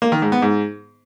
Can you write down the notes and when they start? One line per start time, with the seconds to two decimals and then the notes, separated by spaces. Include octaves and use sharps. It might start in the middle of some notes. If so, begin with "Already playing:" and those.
0.02 A#3
0.12 D#3
0.22 G#2
0.32 B3
0.42 G#2